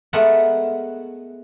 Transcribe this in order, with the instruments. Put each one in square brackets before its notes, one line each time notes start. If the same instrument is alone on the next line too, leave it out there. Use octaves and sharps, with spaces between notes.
[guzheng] G#3 A3 B3 A#4 E5 F#5